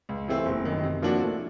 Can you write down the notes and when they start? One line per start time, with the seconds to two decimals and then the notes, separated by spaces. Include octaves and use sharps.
0.09 C#2
0.28 C3 E3 A3 C4
0.46 F#1
0.65 F#2 D#3
0.83 C3
1.02 F3 A#3 D4 F#4
1.21 A2